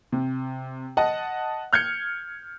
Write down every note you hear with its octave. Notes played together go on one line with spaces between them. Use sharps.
C3
D#5 F#5 A5
F6 G6 G#6 C#7